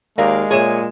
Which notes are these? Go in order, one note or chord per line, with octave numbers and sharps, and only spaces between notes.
D#2 G#3 A#4 D5 F5
A#2 G#4 C#5 E5 E7